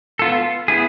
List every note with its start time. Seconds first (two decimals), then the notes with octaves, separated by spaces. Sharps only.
0.19 B3 F4 A4
0.68 B3 E4 G#4